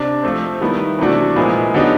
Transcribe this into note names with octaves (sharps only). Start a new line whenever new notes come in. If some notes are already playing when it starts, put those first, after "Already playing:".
Already playing: C3 D4
F3 A3 C4
D#3 G3 B3 E4
C3 E3 A3 D4 F#4
A#2 F3 G#3 B3 E4
D3 F#3 B3 D#4 G4